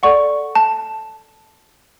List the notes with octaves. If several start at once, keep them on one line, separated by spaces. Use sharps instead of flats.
A4 D5 F#5 C#6
A5